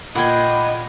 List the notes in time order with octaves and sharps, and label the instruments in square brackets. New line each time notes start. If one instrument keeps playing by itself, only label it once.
[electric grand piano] A#2 G#6 [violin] D#5 [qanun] F#5 G5 C6 [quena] B5